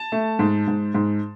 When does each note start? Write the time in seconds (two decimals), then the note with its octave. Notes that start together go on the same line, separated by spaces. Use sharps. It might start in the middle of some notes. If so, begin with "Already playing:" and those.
Already playing: A5
0.12 A3
0.39 G#2
0.68 G#2
0.95 G#2